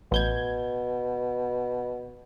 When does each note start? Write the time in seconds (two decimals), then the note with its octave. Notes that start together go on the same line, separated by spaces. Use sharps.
0.12 A1 B2 G6 G#6